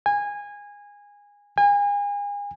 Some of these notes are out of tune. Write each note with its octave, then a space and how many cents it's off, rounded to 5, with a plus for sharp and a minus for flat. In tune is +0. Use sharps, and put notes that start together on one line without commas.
G#5 -20
G#5 -35